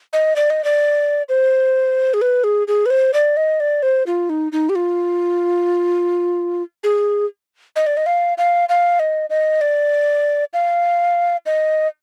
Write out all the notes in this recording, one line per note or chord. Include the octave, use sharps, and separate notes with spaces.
D#5
D5
D#5
D5
C5
G#4
B4
G#4
G#4
B4
C5
D5
D#5
D5
C5
F4
D#4
D#4
G4
F4
G#4
D#5
D5
D#5
F5
F5
F5
D#5
D#5
D5
F5
D#5